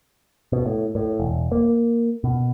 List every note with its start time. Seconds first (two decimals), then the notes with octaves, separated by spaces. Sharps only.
0.52 B2
0.66 A2
0.95 A2
1.20 E1
1.52 A#3
2.24 B2